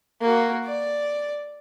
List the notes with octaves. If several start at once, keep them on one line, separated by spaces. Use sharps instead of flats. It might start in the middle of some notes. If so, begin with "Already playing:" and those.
A#3 F#4
D5